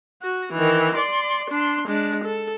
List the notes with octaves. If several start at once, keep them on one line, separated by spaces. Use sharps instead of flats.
F#4
D#3 E3
D5 C6
D4 C6
G#3 D4
A4